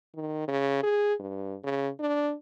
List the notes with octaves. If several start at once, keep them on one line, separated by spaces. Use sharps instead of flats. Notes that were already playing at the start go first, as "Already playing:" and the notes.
D#3
C#3
G#4
G2
C#3
D4